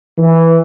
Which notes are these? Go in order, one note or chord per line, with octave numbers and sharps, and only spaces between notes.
E3